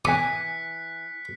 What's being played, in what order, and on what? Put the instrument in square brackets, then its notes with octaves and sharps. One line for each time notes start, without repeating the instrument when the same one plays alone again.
[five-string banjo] E3 G#5 [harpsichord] D#6 [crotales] F#6 B6 C#7